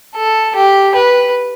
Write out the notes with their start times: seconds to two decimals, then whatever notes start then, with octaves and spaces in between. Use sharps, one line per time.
0.16 A4
0.55 G4
0.95 B4